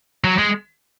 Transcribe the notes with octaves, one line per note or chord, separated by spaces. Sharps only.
F#3
G#3